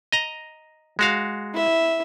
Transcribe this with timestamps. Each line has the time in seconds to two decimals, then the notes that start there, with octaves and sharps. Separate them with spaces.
0.12 D#5 A#5
0.99 G#3 F#4 F5
1.53 E4 E5